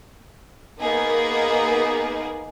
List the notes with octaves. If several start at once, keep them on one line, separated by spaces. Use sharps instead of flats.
A#3 B3 D#4 G#4